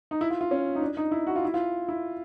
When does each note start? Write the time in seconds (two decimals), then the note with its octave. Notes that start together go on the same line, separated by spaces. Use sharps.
0.11 D#4
0.21 E4
0.30 F4
0.41 F4
0.51 C#4
0.75 D#4
0.82 D4
0.97 D#4
1.12 E4
1.27 F#4
1.36 F4
1.45 E4
1.54 F4
1.89 E4